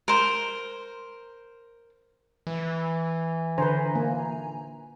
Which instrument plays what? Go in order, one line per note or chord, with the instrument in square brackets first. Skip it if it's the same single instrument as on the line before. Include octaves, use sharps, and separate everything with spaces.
[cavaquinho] A#4 C5
[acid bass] E3
[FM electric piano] D3 G#5 A#5 [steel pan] B4 C5
[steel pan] A#3